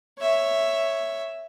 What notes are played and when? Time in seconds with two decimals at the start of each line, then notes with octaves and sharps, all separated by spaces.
0.19 C#5 E5